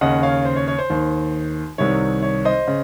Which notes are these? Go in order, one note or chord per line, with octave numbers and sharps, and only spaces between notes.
D#2 C#3 D#5 F#5
C#5 F5
C5
C#5
C#5
C5
D#2 D#3
C2 C3 D#3 C#5
C#5
C5 D#5
C#3